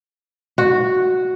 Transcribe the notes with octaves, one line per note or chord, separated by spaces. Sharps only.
F#4